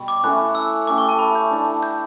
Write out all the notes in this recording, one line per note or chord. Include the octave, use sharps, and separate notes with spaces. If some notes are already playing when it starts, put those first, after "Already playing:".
Already playing: B2 G3
D6
E3 A3 C#4 E4 F#6
E6
A3 C#4 G4 D6
C#6
A5
B5
G6
E3 A3 D4
G6